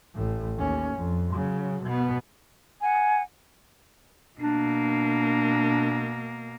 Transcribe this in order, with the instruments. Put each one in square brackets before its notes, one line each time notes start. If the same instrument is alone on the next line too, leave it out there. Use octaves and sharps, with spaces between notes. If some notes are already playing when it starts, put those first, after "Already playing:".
[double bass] A1 A2
D#2 C#4
F2
C#3 F#3
B2 B3
[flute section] F#5 G#5
[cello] B2 A#3 [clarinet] D4